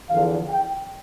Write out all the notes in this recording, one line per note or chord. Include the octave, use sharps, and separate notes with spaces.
E2 D3 F3 F5
G5